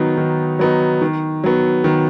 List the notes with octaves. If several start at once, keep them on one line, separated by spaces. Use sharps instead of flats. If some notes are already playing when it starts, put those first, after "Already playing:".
Already playing: D#3 F#3 B3 D#4
D#3
F#3 B3 D#4
D#3
F#3 B3
D#3